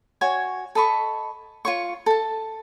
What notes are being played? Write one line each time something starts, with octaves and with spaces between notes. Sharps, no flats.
F#4 C#5 G#5
A4 D#5 B5 C#6
F4 C#5 C#6
A4 A5